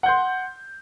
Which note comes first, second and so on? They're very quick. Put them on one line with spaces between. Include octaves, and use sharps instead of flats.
F#5 G6 C6